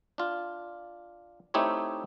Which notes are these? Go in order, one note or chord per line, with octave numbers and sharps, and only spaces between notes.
D4 F4
A3 C4 D#4 E4 G4 C#5